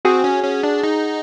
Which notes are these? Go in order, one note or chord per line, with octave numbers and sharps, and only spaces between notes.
C4 F#4 G#4
C#4
C#4
D4
D#4